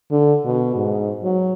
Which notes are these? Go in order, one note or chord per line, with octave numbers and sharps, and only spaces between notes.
D3
B2
G#2
F#3